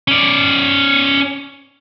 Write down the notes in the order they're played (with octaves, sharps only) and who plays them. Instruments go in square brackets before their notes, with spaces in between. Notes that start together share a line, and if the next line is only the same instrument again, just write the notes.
[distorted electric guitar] C#4 D5